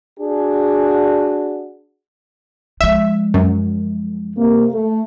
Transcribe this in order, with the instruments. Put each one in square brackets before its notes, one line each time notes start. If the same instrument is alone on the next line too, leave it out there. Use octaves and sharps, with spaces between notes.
[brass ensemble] D4 F#4 G#4
[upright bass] F3 G#3 [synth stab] E5
[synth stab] F#2
[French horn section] C3 A#3
A3